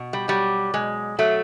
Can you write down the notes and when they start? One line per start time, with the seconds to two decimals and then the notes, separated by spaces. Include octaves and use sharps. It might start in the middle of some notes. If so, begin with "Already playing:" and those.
Already playing: B2
0.13 G3
0.28 F#3 G3
0.74 B2 G#3
1.19 F#3 A3